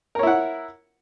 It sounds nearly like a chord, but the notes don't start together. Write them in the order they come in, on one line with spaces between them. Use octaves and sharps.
A#4 C#5 E4 F#5